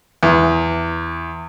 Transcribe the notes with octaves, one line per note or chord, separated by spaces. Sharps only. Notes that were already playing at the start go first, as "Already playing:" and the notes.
E2